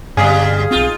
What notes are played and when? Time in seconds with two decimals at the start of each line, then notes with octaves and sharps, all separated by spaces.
0.17 G2 B2 D3 G3 G#3 G#4 F5
0.71 B1 C4 D#4 F4